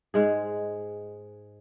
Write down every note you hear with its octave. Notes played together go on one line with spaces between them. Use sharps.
G#2 G#3 G#4